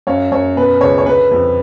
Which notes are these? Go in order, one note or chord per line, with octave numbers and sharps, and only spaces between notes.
F#2 C#5 F5
F#2 C#5
B2 B4
C#2 C#5
C#5
D3 B4
F2